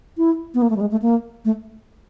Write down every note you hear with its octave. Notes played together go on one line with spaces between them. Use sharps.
E4
B3
A#3
A3
G3
G#3
A3
A#3
A3